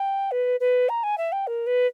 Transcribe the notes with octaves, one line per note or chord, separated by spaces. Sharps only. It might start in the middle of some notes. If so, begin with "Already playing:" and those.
Already playing: G5
B4
B4
A#5
G#5
E5
G5
A#4
B4